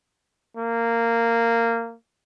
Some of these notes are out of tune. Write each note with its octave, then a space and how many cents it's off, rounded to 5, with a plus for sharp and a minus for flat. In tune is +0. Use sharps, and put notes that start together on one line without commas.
A#3 -15